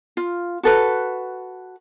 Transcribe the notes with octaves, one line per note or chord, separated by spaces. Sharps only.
F4
F#4 A4 B4